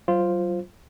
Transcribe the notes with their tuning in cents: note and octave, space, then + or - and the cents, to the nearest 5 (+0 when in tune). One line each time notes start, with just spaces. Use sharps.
F#3 +30 F4 +0 C5 +0